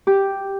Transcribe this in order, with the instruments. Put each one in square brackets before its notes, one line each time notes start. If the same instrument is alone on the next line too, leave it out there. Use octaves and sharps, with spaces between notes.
[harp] G4